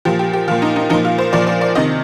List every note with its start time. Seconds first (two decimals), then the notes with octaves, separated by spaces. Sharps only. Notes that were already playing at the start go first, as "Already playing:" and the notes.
0.05 A#2 F3 G4
0.19 G4
0.33 G4
0.48 A#2 F3 F4
0.62 D#4
0.76 D#4
0.90 F3 D#4
0.94 A#2
1.05 F4
1.18 C5
1.33 A#2 F3 D5
1.47 D5
1.61 D5
1.75 C3 D#3 D#5